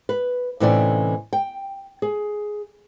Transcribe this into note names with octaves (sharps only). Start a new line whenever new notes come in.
B4
A2 C3 E3 C#4 D#4 D5
G5
G#4